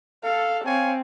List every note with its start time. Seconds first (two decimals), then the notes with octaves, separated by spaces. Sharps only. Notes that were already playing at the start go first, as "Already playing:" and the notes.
0.24 A4 F5
0.65 C4 C#5 F5 G#5